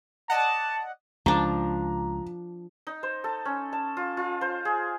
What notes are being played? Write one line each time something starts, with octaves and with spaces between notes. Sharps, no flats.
D5 D#5 F#5 A5
C#2 F3 D4 A#5
D#4
C5
A4
C#4
A5
F4
F4
C5
G#4